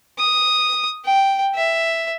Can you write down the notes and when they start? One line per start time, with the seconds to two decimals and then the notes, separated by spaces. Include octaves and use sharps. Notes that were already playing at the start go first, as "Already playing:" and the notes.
0.19 D#6
1.05 G5
1.55 E5